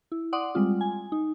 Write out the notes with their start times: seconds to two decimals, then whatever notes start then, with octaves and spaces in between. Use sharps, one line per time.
0.12 E4
0.33 D5 F#5 C6 D6 D#6
0.55 G3 G#3 C4 F4
0.81 G#5
1.12 D#4